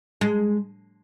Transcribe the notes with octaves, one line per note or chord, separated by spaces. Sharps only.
G#3